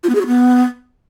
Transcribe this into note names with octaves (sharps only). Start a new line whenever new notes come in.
F4
B3
G#4
F#4
B3